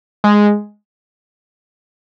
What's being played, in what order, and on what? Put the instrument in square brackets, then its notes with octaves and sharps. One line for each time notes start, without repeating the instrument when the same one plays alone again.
[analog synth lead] G#3